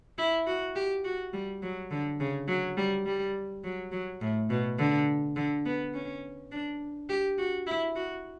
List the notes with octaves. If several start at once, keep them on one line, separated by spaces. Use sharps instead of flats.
E4
F#4
G4
F#4
G3
F#3
D3
C#3
F#3
G3
G3
F#3
F#3
A2
B2
D3
D3
B3
C#4
D4
G4
F#4
E4
F#4